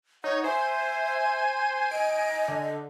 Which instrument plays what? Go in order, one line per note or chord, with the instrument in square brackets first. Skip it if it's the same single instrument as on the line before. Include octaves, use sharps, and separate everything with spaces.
[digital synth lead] D#4 [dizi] C#5 [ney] F#5
[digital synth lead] C5 [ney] E5 [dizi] G#5
[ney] D#5 [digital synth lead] D7
[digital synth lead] D3